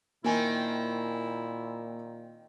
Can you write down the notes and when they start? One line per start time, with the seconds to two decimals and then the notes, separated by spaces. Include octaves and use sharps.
0.24 A#2 D#3 A#3 C4 E4 G#5